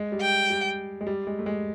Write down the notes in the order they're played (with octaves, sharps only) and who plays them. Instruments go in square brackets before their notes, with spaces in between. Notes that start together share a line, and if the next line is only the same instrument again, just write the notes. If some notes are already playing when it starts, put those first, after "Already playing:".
Already playing: [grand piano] G#3
G3
[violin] G5
[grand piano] G3
G#3
G3
G#3
A3
G#3